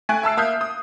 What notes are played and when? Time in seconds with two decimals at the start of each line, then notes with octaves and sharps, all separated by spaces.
0.09 A3 G#5 C#6 F#6 D7
0.23 E5 A5 E6 C7
0.37 A#3 E5 D#6 F6 G6
0.61 D#6